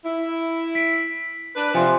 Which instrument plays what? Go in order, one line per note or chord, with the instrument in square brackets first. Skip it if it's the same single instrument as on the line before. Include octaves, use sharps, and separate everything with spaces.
[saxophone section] E4
[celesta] B6 D7
[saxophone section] D4 B4
[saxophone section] C3 F3 [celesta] C5 G#5 C6